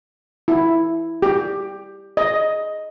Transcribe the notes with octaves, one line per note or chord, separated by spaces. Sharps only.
E4
G4
D#5